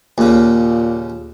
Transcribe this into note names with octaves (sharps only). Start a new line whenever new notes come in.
D#2 A#2 C#3